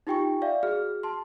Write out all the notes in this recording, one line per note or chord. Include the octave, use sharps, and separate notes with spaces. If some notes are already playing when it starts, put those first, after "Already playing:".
D#4 F4 G4 G5 G#5 C#6
D5 E5 F5
F#4 G#4 F6
A5 C6